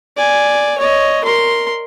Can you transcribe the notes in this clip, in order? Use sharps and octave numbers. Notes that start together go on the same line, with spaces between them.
D5 G#5
C#5 D#5
A#4 C6